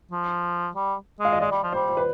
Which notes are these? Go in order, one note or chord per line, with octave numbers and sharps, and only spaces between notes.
F3
G3
G#3
F5
D#5
G#3 D5
G3
F3
G3 C5
C5
B4